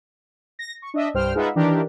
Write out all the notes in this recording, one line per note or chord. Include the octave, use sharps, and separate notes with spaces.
A#6
C#6
D4 D#5 E5
C2 G2 C5 G5 F6
G#3 D#4 F4 B4 E5 F#5
D#3 E3 D4 G4 A#4